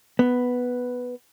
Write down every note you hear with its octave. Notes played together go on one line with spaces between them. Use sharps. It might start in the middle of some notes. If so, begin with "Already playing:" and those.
B3